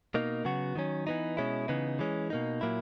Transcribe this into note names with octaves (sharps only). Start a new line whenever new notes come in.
B2 A#3 D#4
C#3 F#3 B3 F#4
D#3 F#3 C#4
E3 B3 D#4
B2 G#3 C#4 E4
C#3 E3 B3 D#4
E3 G#3 C#4
B2 A#3 D#4
A#2 F#3 A#3 E4